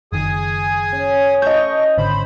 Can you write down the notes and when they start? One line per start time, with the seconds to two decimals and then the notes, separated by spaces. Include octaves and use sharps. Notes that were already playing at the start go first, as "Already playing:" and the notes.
0.12 F#1 D#3 G#4 G#5 D#6
0.92 C#4
1.42 A3 A4 D#5 C#6 G6
1.97 G#1 D3 C5 B5